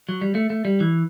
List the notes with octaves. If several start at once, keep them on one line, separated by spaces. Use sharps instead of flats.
F#3
G3
A3
A3
G3
E3